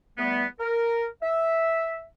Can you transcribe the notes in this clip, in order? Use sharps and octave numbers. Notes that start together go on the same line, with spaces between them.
E2 G3 A3 B3
A#4
E5